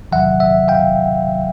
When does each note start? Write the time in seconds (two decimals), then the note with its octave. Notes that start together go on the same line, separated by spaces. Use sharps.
0.11 E2 C3 D#3 F#3 E5 F#5
0.40 E5 F#5
0.68 F5 G5